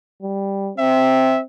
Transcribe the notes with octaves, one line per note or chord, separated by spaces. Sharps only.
G3
C4 E5